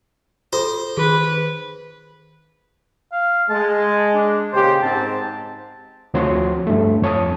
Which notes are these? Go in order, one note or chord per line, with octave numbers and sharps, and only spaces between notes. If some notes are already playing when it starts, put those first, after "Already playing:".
F4 A4 C5
D#3 G#4 B4
F5
G#3 A5
D4
A#2 C#3 G4 C5
G#2 C4 A5
D2 F3 C4 F#4 C#5 C6
G2 A3
F2 C#5 A5 D#6